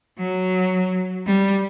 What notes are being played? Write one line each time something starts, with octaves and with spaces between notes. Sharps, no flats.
F#3
G3